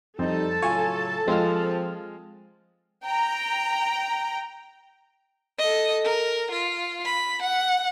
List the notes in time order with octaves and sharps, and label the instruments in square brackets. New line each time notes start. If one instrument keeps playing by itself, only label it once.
[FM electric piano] F2 [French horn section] G3 D#4 [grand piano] C4 [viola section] A4 A5
[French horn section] A2 C#3 F#3 [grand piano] F4 G#5 [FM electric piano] C#5
[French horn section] F3 [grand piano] G#3 [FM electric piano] C4 F4 F6
[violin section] G5 A#5
[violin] A4 D#5
A#4
F4
B5
F#5